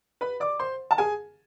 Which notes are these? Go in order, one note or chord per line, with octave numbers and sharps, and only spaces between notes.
B4 B5
D5 D6
C5 C6
A5
G#4 G#5